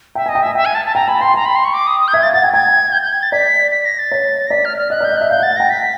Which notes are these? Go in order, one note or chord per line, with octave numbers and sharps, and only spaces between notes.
E5 G5
G#5
D#5
G5
E5 G#5
E5 G5
G#5
A5
A5
G5 A#5
G#5 B5
G5 C6
G5 A#5
B5
C6
C#6
D6
D#6
D#6
G6
E5 G#6
F5 A6
F#5 A6
G5 G#6
G5 G#6
G6
G6
G#6
A6
D5 B6
B6
A#6
A6
C#5
A#6
D5 B6
F6
F6
D#5 F#6
D5
G6
D#5
E5 F#6
F5 G6
F#5
A6
F#5
G5 A#6
B6